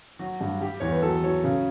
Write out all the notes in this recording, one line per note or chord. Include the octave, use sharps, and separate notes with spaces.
F#3 F#4
G2
G3 G4
E2 C#5
B4
F#3 A4
F#3 C#5
C#3